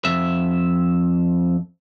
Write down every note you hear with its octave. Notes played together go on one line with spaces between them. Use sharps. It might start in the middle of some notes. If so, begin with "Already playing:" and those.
F2 E5